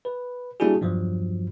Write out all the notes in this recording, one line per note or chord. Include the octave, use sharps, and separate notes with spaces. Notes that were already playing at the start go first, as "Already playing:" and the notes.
B4
G3 A#3 D4 E4 F#4 G#4
E2 G2 F3 F#3